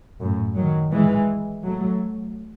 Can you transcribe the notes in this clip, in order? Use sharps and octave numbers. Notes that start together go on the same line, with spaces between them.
F#2 A2
D#3 F#3
E3 G#3
F#3 A3